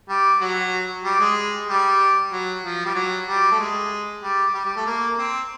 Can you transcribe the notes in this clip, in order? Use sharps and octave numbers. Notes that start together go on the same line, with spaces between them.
G3
F#3
G3
G#3
G3
F#3
F3
G3
F#3
G3
A3
G#3
G3
G3
G3
A3
A#3
C4